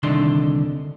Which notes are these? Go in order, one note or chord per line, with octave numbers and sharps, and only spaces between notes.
C2 D3 D#3 D4 C6